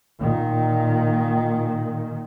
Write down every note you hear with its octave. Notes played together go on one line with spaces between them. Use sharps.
A#2 D#3